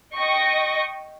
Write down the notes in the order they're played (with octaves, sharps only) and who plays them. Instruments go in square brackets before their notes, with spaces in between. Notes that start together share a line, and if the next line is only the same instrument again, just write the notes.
[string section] D#5 G5 C#6 A#6